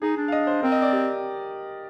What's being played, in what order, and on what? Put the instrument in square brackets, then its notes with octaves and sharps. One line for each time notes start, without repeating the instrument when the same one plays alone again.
[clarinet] D#4 [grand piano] G#4
[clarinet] D4
[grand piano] F5
D#5
C5
[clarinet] C4 [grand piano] A#4
[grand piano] D#5
D5
G4